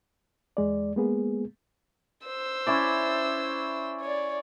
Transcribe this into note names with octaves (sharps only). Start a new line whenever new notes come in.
E2 G#3 D5
G#3 A#3 B3 G#4
C5 E6
C#4 E4 D5
C#5 D5